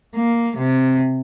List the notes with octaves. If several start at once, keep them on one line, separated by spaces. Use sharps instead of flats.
A#3
C3